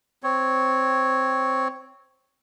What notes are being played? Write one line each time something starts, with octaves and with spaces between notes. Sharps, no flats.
C4 C#5